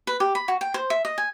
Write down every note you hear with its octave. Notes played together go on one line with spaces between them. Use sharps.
B4
G4
B5
F#4
G5
C5
E5
D#5
G#5